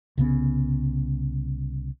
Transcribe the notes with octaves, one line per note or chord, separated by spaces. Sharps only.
C2 C#3 B3